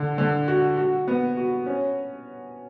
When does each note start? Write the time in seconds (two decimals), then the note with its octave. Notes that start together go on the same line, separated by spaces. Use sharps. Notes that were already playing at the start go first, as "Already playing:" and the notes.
Already playing: D3
0.18 D3
0.48 F#4
0.77 F#4
1.08 B3
1.37 F#4
1.66 C#4